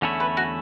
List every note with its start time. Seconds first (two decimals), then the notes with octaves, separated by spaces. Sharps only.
0.02 E2 D3 A3 C#4 E4
0.20 B4
0.37 F#4